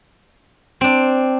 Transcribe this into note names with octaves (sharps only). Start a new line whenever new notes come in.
C4 D4